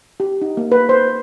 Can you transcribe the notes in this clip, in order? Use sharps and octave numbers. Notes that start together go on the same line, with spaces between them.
G4
D#4
A#3
B4
C5